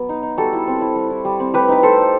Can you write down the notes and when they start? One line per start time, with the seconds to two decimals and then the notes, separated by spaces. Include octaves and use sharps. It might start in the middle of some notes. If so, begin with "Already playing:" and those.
Already playing: F#3 B3
0.09 D#4
0.23 D#4
0.37 G3 F#4 A4
0.53 E4
0.67 C4
0.81 E4
0.96 G3
1.10 E4
1.25 G3
1.40 C4
1.54 A3 G4 B4
1.69 D#4 B4
1.83 A3 A4 C5
1.98 D#4